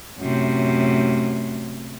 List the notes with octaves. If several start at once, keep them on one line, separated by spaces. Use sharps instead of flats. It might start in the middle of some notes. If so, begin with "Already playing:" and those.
F#2 A2 C3